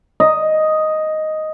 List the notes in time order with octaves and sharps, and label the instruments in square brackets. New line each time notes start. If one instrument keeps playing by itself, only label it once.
[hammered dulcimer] D#5